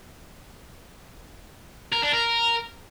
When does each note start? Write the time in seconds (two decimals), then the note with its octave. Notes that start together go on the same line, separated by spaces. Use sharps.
1.92 A#4
2.02 D4
2.12 A#4